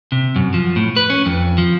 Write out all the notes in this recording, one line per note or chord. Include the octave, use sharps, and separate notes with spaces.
C3
F#2
F3
A2
B4
C#4
F2
F3